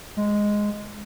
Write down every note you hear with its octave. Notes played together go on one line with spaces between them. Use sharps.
G#3